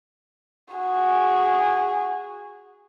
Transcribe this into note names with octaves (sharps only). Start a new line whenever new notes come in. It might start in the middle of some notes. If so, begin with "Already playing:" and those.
F#4 G#4